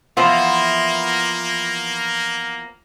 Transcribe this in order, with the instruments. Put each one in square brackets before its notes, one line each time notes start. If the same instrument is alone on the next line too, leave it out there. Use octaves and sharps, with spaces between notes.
[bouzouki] E3 F3 B3 [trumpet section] A#3 [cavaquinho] F4 C5 E5